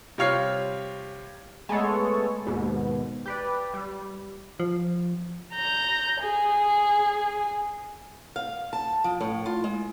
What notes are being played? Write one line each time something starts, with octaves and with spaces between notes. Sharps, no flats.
C3 G3 F4 C#5 F6 C7
G#3 A3 B3 A4 C#5
D#2 G#2 B2
G4 B4 D5
G3
F3
A#5 G6
G#4
F5
A5
F3
A2
F4
G#3